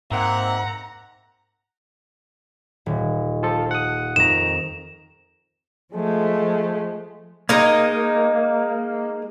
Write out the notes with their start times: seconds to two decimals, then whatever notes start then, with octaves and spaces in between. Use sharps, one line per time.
0.11 G#2 A#3 C4 E5 F#5 A#5
2.86 D#1
3.43 F3 F4 A4
3.71 F#5 D#6
4.16 F2 D#3 A#5 E7
5.93 F3 G#3 A3
7.49 G#3 A#3 D#4